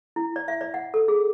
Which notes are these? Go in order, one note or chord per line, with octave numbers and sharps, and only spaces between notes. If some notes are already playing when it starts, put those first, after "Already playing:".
E4
D5
E5
D5
F#5
A4
G#4